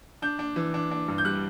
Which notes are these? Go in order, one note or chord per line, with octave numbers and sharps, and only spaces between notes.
D4 G6
D4
E3
D4
D4
G2
G6
G3 F#6